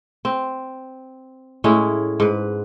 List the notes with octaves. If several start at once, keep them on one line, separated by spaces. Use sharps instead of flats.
C4
A2 G#3 C#4 E4
G#2 B4